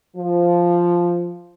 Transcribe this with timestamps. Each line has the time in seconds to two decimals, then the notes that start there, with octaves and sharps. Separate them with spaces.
0.16 F3